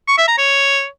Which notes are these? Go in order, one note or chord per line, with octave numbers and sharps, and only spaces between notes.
C#6
E5
A#5
C#5